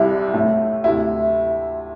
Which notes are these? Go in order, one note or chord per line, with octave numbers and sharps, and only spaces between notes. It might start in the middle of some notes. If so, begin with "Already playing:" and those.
Already playing: C2 C3 G3 E4
A2 A3
D2 C3 A3 E4